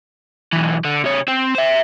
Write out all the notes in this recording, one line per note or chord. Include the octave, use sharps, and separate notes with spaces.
B1 E3
D3
C3 C#5
C4
C5 E5